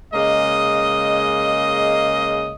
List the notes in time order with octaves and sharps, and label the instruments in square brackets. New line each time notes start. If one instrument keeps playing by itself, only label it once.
[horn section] C#3 G#3 A#3 D#5